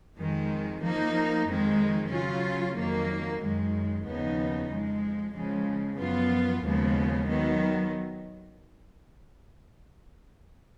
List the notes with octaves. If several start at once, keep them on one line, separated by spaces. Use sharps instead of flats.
F2 D#3 G#3
F3 A#3 D#4
F2 D#3 G#3
C#3 F#3 C#4 F4
F2 D#3 F#3 A#3
F#2 D#3 G#3
D#2 C#3 F3 B3 D#4
F2 F3 G#3
C#3 F3 G#3
F#2 F3 B3 F4
D#2 C#3 F3 G#3 B3
D#3 F#3 B3